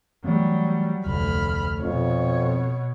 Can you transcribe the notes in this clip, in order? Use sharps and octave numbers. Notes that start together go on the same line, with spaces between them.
E3 F#3 G3 A3 B3
F1 D2 B5 F6
F2 B2 C#5